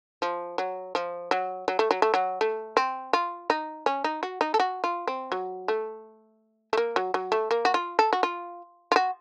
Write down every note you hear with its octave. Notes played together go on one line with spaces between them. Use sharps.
F3
F#3
F3
F#3
F#3
A3
F#3
A3
F#3
A3
C4
F4
D#4
C#4
D#4
F#4
D#4
A4
F#4
F4
C4
F#3
A3
A3
A#3
F#3
F#3
A3
A#3
F#4
F4
A4
F#4
F4
F4
F#4